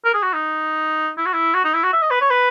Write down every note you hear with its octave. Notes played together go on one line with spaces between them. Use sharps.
A#4
G#4
F#4
D#4
E4
F#4
E4
F#4
D#4
E4
F#4
E5
D#5
B4
C#5
B4